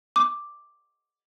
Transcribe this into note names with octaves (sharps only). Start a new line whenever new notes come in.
D6